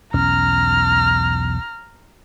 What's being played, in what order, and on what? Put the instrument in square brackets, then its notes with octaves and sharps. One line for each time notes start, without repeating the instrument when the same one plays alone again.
[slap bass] B1 E2 C#4 [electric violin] A#5 F6